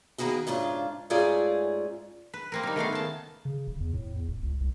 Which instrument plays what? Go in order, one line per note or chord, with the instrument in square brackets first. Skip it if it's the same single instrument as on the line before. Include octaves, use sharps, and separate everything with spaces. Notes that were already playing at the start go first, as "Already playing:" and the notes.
[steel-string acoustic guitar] D#3 A#3 B3 F#4 G#4
G#2 C#3 D4 F4
G#2 A3 C#4 F4 G#4 D5
[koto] B4
A#3 C4 A#4
G3 D#4
D#3 A3 B3 F5
C#3 A5
[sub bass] C#3
D#1
E2
A2
E2
D#1
C#2
C2